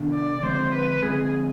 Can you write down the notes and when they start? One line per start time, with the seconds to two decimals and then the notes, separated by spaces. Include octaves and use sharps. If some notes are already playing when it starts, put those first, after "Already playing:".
Already playing: C3 D#3 B3 D4
0.13 D5
0.42 D3 F3 G#3 C4 C5
0.73 B4
1.02 D3 F3 G#3 C4 G#4